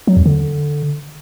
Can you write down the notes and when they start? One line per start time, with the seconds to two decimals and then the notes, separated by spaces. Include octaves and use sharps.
0.07 F#3
0.17 E2
0.26 D3